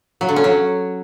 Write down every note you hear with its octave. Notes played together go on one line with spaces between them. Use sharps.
F#3
D3
C#4
F#3